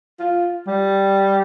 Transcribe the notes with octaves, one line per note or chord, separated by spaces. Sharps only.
F4
G3